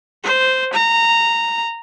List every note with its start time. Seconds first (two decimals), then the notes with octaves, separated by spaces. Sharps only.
0.24 C5
0.73 A#5